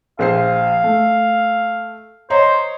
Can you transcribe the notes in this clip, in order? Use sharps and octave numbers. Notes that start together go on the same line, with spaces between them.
A#1 C5 F5 C7
A3
C5 C#5 D#5 A#5